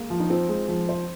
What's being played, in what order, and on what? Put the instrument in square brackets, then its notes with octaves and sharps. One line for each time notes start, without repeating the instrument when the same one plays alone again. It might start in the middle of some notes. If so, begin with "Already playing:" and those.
Already playing: [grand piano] G#3 A#3
[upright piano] F3
[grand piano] D#4
[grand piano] C4 [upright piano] F4
[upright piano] G#3
F3
C5